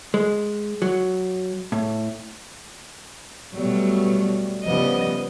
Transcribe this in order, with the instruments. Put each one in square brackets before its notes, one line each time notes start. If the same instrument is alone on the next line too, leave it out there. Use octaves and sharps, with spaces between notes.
[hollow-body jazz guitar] G#3
F#3
A2
[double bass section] B2 G3 [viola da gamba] F#3 A3 B3
[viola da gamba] C#3 G3 D#5 [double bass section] F3 B3